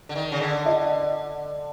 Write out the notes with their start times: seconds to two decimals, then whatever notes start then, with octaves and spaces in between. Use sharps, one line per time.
0.09 D3
0.16 D#3
0.32 C#3
0.41 D3
0.66 D#5